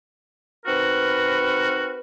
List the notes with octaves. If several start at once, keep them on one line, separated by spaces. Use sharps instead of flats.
C4 D#4 F#4 A#4 B4